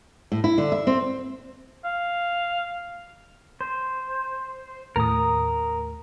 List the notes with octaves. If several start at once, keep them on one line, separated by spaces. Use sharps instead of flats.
A2
E4
D3
E5
C4
F5
C5
D#2 A2 A#4 D#6